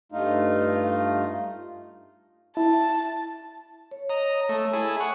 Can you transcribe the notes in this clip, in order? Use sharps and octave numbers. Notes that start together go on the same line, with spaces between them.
G2 A3 D#4 F4
E4 A5
C#5
D#5 A#5
A3
E4 G#4 A4
C#5 F#5